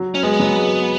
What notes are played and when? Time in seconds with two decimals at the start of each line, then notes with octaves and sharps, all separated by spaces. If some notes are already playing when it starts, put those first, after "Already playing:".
Already playing: F#3
0.15 C#4
0.23 G#3 B3
0.40 F#3
0.57 G#3